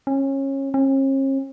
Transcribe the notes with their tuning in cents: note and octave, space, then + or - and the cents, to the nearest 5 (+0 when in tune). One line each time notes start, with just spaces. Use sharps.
C#4 -25
C#4 -45